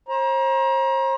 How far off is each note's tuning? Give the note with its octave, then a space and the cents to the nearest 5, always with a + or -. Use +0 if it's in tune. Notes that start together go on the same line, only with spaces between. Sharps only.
C5 +40 A#5 +35